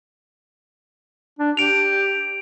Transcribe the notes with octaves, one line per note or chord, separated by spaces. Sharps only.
D4
G4 D7 F7